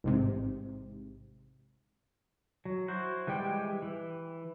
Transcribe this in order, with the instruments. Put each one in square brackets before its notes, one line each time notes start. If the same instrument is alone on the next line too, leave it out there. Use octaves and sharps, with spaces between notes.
[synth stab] A1 G#2 C3
[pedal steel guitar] F#3
E4 F#4 C5
E3 G3 G#3 G4 G5
E3